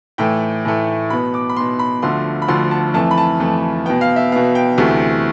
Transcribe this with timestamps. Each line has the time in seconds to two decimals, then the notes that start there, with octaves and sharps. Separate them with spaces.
0.18 A2 E3 A3 G5
0.65 A2 E3 A3
1.10 B2 B3 B5
1.34 D6
1.49 B5
1.56 B2 B3 C6
1.79 B5
2.02 D2 D3 F3 A3 C6
2.42 B5
2.48 D2 D3 F3 A3 C6
2.71 A5
2.94 F2 E3 A3 A5
3.11 B5
3.18 A5
3.40 F2 E3 A3
3.86 B2 B3 G5
4.01 F5
4.16 E5
4.32 B2 B3 F5
4.55 G5
4.77 D2 C3 E3 A3